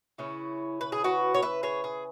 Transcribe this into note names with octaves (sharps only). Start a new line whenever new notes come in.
C#3 E3 C#4 E4
B4
G#4
F#4 B4
C#5
B4 E5
G#4 C#5
G#4